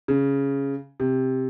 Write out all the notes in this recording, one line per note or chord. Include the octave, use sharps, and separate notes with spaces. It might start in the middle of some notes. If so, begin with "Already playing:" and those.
C#3
C3